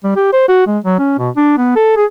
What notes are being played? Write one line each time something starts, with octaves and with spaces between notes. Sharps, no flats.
G3
G4
C5
F#4
G#3
F#3
C#4
B2
D4
B3
A4
G#4